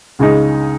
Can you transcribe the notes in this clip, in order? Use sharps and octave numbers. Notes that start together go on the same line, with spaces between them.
C#2 C#3 G#3 D#4